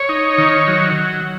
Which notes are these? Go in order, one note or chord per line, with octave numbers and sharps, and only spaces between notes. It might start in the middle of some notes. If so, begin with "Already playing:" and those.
Already playing: C#5
D#4
D#3
F#3